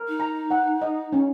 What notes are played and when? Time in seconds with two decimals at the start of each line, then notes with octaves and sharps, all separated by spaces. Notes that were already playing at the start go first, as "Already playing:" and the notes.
Already playing: A#4
0.08 D#4
0.20 A#5
0.51 F#5
0.82 D#5
1.12 C#4